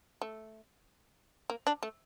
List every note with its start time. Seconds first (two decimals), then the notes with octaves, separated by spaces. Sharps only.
0.22 A3
1.50 A#3
1.67 D4
1.83 A3